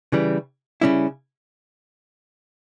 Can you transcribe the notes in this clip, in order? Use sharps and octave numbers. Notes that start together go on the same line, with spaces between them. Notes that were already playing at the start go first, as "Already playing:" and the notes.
C#3 E3 G3
C#3 G3 C#4 E4